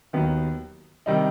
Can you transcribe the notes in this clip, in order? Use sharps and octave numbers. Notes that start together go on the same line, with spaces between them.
D#2 D#3 F#3 B3
C3 D#3 G3 D#4